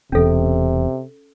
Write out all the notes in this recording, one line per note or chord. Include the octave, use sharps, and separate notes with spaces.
E1 E2 C3 C#4 A4